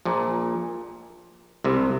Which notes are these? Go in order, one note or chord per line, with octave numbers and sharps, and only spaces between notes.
A#1 A#2
C2 C3